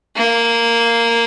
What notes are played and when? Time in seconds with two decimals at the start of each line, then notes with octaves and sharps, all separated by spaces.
0.16 A#3